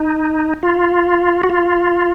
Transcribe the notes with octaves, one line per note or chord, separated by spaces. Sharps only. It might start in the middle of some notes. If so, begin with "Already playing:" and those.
Already playing: D#4
F4
F#4
F4